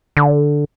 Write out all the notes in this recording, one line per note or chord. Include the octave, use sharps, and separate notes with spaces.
D3